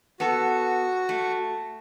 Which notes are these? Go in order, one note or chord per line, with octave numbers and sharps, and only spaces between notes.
B3 F#4 A4
A3